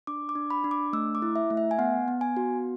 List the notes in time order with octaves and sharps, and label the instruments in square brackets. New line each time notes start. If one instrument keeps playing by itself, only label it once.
[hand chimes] D4 D6
D6
D4
B5
D4
D6
A3 E6
D6
E4
E5
A3
E5
G#5
B3 F#5
B3
G#5
F#4